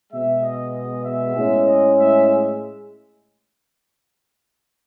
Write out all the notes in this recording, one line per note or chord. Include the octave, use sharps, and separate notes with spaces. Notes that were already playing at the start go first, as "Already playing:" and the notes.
B2 G#3 B3 E5
D#5
D#5
E5
A2 G#3 C#4
D#5
E5